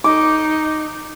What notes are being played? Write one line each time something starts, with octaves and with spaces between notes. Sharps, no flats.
D#4 D6